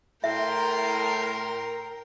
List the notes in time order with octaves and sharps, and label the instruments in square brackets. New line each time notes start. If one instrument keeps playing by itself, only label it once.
[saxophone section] A2 [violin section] A#4 [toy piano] E5 [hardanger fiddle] G5 C6